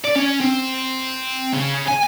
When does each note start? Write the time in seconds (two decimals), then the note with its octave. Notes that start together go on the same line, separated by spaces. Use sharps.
0.04 D5
0.16 C#4
0.40 C4
1.53 C#3
1.88 G#5